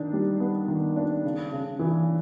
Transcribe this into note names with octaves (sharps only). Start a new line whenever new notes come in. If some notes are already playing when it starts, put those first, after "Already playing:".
Already playing: D#3 D4
G3
B3
D#3
D4
C#3
C#3
E3